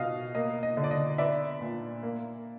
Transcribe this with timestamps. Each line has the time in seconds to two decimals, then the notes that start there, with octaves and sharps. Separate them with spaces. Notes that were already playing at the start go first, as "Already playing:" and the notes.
Already playing: B2 D#5 F5
0.35 A#3 D#5
0.63 D#5
0.77 D3
0.84 D5
0.91 D#5
1.18 B3 D5 E5
1.61 A#2
2.03 A#3